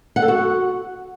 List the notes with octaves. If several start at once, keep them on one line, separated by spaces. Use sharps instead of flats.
F#5
A4
F#4